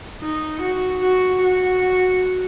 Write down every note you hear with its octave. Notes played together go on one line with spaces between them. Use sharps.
D#4
F#4
F#4
F#4